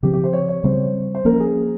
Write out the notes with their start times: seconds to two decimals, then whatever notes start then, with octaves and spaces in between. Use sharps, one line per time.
0.03 C#3 F3 C4 G4
0.14 G4
0.24 C5
0.33 C#5
0.49 C#5
0.64 C#3 G3 C4 C5
1.15 C5
1.25 F3 A#3 C#4 A#4
1.40 G#4